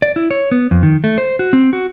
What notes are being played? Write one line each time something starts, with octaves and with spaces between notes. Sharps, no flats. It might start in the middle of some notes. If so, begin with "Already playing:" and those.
D5
E4
C#5
B3
F2
D#3
A3
C5
F#4
C4
F#4